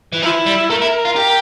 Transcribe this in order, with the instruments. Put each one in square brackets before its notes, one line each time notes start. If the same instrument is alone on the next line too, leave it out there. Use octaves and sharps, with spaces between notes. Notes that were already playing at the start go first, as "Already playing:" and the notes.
[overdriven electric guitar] E3
[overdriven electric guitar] F3 [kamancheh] E4
[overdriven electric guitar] G3
[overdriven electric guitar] A3 [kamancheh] A#4
[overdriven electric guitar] E4
F4
G4